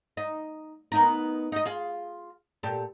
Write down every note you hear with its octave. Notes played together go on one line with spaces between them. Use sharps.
D#4
B3 D#4 A#4
D#4 D#5
F4 G#4
A#2 G4 A4